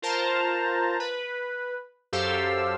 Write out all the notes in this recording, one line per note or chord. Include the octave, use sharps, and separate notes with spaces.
F4 A#4 C5 A5 A#5
B4
F#2 G4 A4 C5 F5 E6